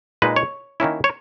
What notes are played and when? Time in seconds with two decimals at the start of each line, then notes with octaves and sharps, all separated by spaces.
0.22 A#2 G#3 D#4 B4
0.36 C#5
0.80 D#3 A#3 C#4 E4
1.04 C#5